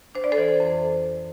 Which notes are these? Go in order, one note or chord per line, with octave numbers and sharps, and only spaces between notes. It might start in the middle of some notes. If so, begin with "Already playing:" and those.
D4 C5
D5
A4 C5
E3
F2